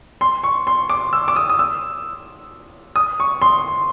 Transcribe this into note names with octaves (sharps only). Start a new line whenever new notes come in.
C6
C#6
C6
D6
E6
D6
D#6
D#6
E6
D#6
C#6
C6